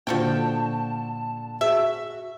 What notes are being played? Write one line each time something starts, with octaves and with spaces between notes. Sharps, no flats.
A#2 D3 F3 F#4 G5 A5
F#4 G#4 E5